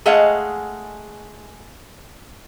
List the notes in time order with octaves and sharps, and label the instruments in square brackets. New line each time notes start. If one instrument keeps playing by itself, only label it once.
[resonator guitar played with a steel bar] G#3 A3 G#4 D#5 F5 F#5